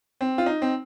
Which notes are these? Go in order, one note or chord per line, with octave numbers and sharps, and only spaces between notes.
C4
F4
D#4
C4